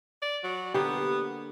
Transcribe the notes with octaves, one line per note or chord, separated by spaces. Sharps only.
D5
F#3
D3 A#3 B3 G4